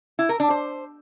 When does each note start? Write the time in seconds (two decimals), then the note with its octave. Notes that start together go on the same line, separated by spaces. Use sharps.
0.19 E4
0.29 A#4
0.40 D4
0.50 C5